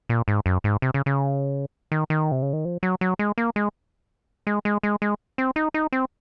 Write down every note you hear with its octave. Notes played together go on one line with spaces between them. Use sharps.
A#2
G#2
F#2
G#2
C3
C#3
C#3
D#3
D#3
C3
C#3
D#3
F3
F#3
F#3
G#3
A#3
G#3
G#3
G#3
G#3
G#3
C4
D#4
D#4
C4